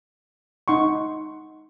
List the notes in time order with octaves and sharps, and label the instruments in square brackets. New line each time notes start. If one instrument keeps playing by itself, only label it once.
[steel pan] D#4 F#5 C6 C#6